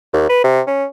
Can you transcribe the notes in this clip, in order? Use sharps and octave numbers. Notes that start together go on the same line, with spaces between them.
D#2
B4
C3
C#4